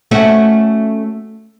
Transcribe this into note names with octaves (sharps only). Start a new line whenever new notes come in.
A3 C#4 F#4